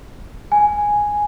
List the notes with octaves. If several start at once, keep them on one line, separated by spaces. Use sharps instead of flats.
G#5